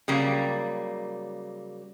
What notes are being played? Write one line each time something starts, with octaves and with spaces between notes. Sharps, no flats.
C#3 F#3 G3 A#3